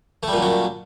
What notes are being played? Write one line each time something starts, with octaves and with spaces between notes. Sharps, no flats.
F#2 A#2 F#3 G3 A3